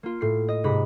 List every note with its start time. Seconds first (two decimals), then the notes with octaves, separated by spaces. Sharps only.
0.03 A#3 F4
0.21 A2 C7
0.49 D#5
0.64 G#2 C3 A#5 B5 B6